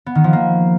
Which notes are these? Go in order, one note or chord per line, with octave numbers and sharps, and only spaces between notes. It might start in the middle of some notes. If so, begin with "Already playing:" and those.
B3
D#3
F3
A#3